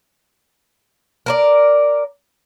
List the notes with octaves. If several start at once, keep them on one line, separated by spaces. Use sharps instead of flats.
A#4 C5 D5